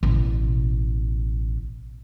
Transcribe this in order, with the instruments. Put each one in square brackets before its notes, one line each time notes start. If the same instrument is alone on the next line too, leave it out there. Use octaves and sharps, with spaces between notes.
[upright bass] A1 B2